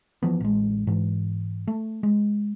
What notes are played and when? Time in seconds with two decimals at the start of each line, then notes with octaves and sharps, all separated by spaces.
0.23 E3 F3 B3
0.40 A1 G#3
0.87 G#2 E3
1.67 A3
2.03 G#3